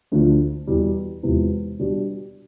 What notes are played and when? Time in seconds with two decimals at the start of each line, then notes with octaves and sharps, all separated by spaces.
0.12 D2 D3 F3
0.67 E2 B2 G3
1.23 E1 E2 C3 F3 B3
1.79 B2 G3 D4 G4